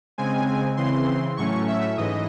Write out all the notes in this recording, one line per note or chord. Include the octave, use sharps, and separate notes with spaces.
C#3 G#3 C4 G#5
C#3 E3 C4 C6
A2 F#3 A3 C#4 C#6
E5
G#2 E3 D#5